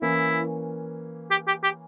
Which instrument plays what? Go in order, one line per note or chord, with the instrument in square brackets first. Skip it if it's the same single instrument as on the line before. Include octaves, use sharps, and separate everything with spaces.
[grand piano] E3 A#3 C#4 [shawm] E4
[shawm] G4
G4
G4